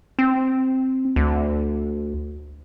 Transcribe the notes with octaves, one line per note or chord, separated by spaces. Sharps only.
C4
D2